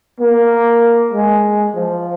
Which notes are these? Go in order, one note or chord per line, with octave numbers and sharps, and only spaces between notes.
A#3
G#3
F3